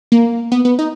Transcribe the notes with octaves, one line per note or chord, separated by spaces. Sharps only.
A#3
B3
B3
D#4